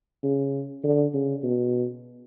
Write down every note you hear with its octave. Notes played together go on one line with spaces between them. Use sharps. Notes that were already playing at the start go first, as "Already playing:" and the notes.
C#3
D3
C#3
B2